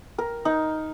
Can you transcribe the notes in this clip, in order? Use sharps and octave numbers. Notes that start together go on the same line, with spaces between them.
A#4
D#4